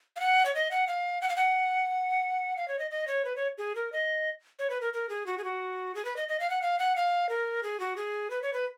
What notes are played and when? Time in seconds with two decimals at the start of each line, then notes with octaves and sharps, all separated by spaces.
0.16 F5
0.20 F#5
0.46 C#5
0.55 D#5
0.71 F#5
0.87 F5
1.21 F#5
1.29 F5
1.36 F#5
2.57 F5
2.68 C#5
2.79 D#5
2.91 D#5
3.07 C#5
3.25 B4
3.36 C#5
3.58 G#4
3.75 A#4
3.92 D#5
4.59 C#5
4.70 B4
4.81 A#4
4.93 A#4
5.09 G#4
5.26 F#4
5.38 G#4
5.44 F#4
5.95 G#4
6.05 B4
6.16 D#5
6.28 D#5
6.40 F5
6.50 F#5
6.62 F5
6.79 F#5
6.96 F5
7.29 A#4
7.63 G#4
7.80 F#4
7.96 G#4
8.30 B4
8.42 C#5
8.53 B4